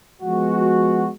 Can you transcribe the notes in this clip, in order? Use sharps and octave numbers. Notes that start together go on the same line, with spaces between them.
F3 G#3 B3 F#4